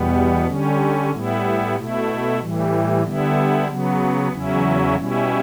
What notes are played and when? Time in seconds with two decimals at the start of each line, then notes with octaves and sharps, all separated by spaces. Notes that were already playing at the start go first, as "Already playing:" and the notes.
Already playing: E2 B2 G3 B3
0.47 D3 G3 C#4
1.12 A2 G3 B3 E4
1.76 B2 A3 E4
2.39 A2 E3 G3
3.04 D3 G3 B3 E4
3.68 C#3 F#3 B3
4.32 E2 C#3 F#3 C#4 E4
4.96 B2 G3 C#4 E4